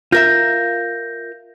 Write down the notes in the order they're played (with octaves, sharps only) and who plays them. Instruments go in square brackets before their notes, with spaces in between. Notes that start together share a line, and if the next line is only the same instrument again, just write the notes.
[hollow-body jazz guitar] F4 A#4 E5 [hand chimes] G6 A#6